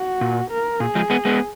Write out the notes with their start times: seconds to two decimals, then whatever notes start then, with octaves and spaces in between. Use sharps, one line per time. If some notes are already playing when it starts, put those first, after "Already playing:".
Already playing: F#4
0.21 A#2
0.51 A#4
0.80 A#2 G#4
0.95 F3 G#3
1.10 G#3 B3
1.25 G#3 B3